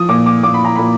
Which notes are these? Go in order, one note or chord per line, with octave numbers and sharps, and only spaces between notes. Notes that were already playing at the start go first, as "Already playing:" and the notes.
Already playing: F3 D#6
A#2 D6
D6
A#2 D6
B5
A#5
A#2 B5